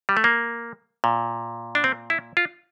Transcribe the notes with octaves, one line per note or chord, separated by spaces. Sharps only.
G3
A3
A#3
A#2
D4
C4
E4
F4